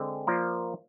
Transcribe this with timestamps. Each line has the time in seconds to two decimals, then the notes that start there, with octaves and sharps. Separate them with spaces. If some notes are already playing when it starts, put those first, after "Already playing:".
Already playing: D3 G#3 C4
0.27 F3 A#3 F4 A#4 D5